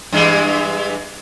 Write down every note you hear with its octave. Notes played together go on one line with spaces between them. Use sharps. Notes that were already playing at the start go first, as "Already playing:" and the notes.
G2 E3 G#3